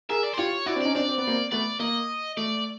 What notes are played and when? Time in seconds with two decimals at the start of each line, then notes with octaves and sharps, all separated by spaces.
0.09 G#4 A#4 E5
0.24 D5
0.34 C5
0.38 F4 G4 C#5
0.66 E4 F#4 D5
0.76 C4 D4
0.81 C#4 D#4 D5
0.95 C4 D4 D5
1.09 C4
1.18 B3
1.27 A#3 C4
1.52 A3 B3 D5
1.80 A#3 D#5
2.37 A3 D5